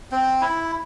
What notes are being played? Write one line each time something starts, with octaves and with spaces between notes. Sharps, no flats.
C4
E4